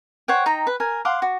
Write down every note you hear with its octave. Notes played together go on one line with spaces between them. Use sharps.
C5 C#5 F#5 G5
D#4 G5 A#5
B4
A#4 G#5
F5 F#5 C6 D6
F#4